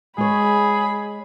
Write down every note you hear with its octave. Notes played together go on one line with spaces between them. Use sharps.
G#3 G#4 C#5 B5